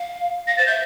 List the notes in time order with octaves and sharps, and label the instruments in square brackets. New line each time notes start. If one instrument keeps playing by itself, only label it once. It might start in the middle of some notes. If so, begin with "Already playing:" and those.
Already playing: [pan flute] F5
[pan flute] F5 [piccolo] A#6
[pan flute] C5 [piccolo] A6
[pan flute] E5 [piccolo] G6